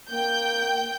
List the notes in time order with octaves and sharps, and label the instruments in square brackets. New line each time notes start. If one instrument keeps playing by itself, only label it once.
[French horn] A#3 [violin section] G5 G6